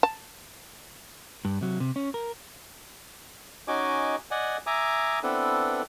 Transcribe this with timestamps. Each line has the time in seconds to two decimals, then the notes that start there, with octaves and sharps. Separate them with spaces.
0.03 A5
1.45 G2
1.61 C3 F#3
1.80 C3
1.96 C#4
2.14 A#4
3.68 C#4 D#4 F#4 D#5 G#5 D6
4.31 D5 D#5 F#5 G#5
4.66 E5 G#5 A#5 D6 D#6
5.23 B3 C4 D4 E4 A4 B4